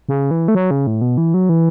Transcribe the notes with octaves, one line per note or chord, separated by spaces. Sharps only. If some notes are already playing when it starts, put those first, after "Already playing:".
C#3
E3
A3
F#3
C#3
A2
B2
E3
F#3
E3